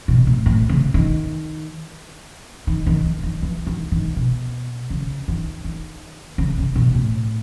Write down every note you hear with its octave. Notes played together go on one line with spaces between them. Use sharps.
B2
A2
A2
C#3
D#3
D#3
D#3
E3
D#3
E3
D#3
D#3
B2
C#3
D#3
D#3
C#3
C#3
B2
A2